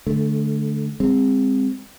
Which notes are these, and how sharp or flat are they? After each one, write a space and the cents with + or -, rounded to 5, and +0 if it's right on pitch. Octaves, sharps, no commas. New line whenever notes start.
D3 +0 A3 -25
G#3 -40 C4 +0